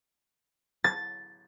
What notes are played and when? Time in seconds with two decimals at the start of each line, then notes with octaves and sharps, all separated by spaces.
0.84 A6